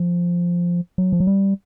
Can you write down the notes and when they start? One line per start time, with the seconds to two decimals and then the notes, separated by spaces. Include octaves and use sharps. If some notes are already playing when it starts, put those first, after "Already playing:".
Already playing: F3
0.98 F#3
1.13 F3
1.20 F#3
1.27 G3